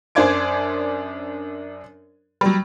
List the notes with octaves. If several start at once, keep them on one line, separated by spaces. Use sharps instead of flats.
F#2 D4 C5 D5 G#6 D7
F#3 G3